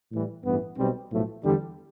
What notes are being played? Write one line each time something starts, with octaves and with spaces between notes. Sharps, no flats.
A2 E3 G3
A1 G2 E3 B3
B1 B2 G3 C4
B1 A2 F3 A3
E2 D3 G3